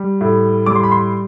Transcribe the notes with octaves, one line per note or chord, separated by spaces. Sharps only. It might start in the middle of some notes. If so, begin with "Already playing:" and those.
Already playing: G3
A2
G3 D6
C6
B5
C6